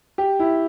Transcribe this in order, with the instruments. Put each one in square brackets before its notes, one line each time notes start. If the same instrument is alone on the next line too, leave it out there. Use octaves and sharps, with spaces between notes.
[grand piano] G4
E4